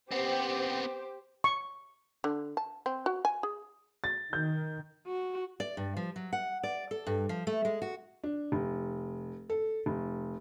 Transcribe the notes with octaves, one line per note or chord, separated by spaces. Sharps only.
B3 C4 G4 C5
C#6
D3
A5
C4
F#4
G#5
G#4
A6
D#3 G6
F#4
D5
G2
F3
F#3
F#5
D5
A4
G2
F3
A3
G#3
F#4
D4
F1
A4
F1